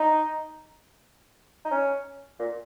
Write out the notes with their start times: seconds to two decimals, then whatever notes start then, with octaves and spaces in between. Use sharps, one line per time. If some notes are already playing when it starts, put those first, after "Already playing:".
Already playing: D#4
1.65 D#4
1.71 C#4
2.39 A#2